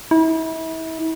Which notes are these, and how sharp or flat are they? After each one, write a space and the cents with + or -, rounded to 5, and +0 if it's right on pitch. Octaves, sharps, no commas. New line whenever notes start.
E4 -35